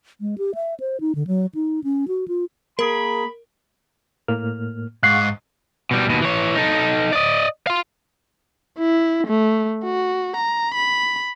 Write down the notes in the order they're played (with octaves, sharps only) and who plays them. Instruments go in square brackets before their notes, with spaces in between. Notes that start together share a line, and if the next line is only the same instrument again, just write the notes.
[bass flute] G#3
G4
E5
C5
D#4
D3
F#3
D#4
C#4
F#4
F4
[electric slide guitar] A#3 G#4 [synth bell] A#4 [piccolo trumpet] B5
[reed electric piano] A2 A#3 F6
[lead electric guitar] G#2 [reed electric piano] F5 F#5 C#6 [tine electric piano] F#6 C7
[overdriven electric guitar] B2 G3
D#2 B2
E3 C#5
D#4 A4
D5 D#5
F5 C6
[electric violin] E4
A3
F#4
A#5
B5